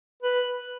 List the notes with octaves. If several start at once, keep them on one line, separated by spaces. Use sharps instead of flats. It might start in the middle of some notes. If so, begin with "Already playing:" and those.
B4